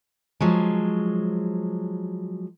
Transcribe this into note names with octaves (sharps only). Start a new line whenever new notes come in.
F3 F#3 G#3